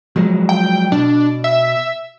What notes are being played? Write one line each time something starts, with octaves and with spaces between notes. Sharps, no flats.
F3 F#3 G#3
G5
B2 D4
E5